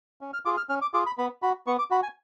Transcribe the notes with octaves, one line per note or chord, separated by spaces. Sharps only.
C#4
F6
F4 G#4 D6
F6
C#4 F6
D6
F4 G#4 D6
B5
B3 B5
F#4 B5
B3 C#6
D6
F#4 B5
G#5